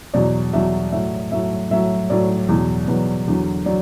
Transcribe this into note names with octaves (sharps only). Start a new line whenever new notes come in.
E2 B2 F#3 D5
E2 B2 F#3 E5
A2 F#3 E5
A2 F#3 E5
A2 F#3 E5
A2 F#3 D5
E2 B2 F#3
E2 B2 F#3 B4
E2 D3 F#3
F#3 D5